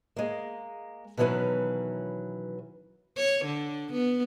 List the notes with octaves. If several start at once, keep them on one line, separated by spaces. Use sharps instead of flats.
G#3 A#3
B2 D#3 E3 F#3 C#4 B4
C#5
D3
B3